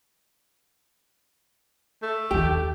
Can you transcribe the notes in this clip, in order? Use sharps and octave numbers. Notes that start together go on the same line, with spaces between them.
A3
D#2 D#3 G4